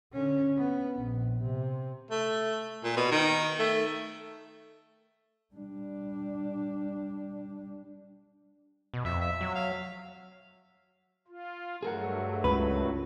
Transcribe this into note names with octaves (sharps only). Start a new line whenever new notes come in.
D3 C#4
B3
A#1
C3
A3
A#2
B2
D#3
A3
G3 D4
B2
F2 E5
E5
F#3
F5
F4
G2 F#3 A3 G#4 A#4 F#5
C#2 B4